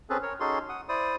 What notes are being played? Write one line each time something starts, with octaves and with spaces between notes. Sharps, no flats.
C4 C#4 G#4 A4 B4
A#4 C#5
C#4 D#4 F#4 G#4 A4 C6
F#5 D#6
E4 C5 D5 D#6